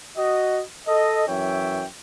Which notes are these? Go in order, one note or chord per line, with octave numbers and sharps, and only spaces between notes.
F#4 D#5
A4 D#5
F#2 E3 C#5 E5 G5